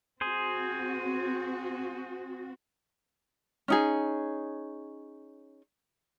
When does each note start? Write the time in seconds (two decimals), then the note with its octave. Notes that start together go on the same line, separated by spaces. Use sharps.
0.21 C4 F#4 G#4 C5
3.68 C#4 D#4 G#4